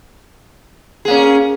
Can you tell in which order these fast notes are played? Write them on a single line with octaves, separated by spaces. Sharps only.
G#4 A#3 C#4